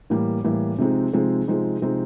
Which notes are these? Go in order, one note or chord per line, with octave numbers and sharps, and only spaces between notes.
A2 E3 G3 A#3
A2 E3 G3 A#3
C3 F3 G#3 C4 D#4
C3 F3 G#3 C4 D#4
C3 F3 G#3 C4 D#4
C3 F3 G#3 C4 D#4